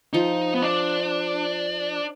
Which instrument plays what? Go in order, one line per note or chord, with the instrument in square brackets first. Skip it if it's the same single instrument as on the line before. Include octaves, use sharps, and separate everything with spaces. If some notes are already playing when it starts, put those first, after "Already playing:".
[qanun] F3 [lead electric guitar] D#4
[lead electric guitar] B3
D4